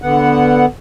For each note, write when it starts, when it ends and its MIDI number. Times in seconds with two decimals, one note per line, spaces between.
0.02 0.66 50
0.02 0.66 59
0.02 0.66 78